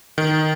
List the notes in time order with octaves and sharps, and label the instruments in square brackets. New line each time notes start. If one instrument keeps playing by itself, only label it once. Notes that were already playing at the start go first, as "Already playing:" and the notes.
[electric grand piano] D#3